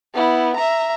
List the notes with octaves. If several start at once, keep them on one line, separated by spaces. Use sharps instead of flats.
B3 E4
E5 A#5